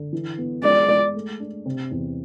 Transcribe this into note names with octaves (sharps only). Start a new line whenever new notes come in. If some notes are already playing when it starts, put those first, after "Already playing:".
Already playing: D3
E3
B3
G#3 D5
G#3
A3
D4
C3
E2